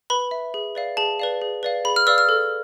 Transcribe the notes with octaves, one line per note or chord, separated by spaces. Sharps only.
B4 B5
E5
G#4
B4 D5 F5
G#4 A5
B4 D5 F5
G#4
B4 D5 F5
G#4 B5
F6
B4 D5 F5 E6
F6
A4